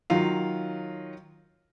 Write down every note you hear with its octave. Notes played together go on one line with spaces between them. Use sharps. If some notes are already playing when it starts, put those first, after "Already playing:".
D#3 F#3 F4 F5